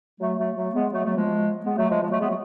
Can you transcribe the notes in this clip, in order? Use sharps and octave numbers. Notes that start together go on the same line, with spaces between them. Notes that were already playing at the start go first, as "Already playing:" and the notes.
F#3 A3
F#3 A3
F#3 A3
G#3 B3
F#3 A3
F#3 A3
F3 G#3
G#3 B3
F#3 A3
F3 G#3
F3 G#3
F#3 A3
G#3 B3
F#3 A3